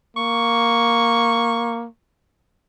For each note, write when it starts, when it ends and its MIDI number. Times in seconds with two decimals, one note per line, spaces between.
0.17 1.87 58
0.17 1.82 85